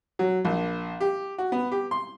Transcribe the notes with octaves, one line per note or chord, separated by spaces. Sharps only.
F#3
A#1
G4
F#4
B3
G4
C6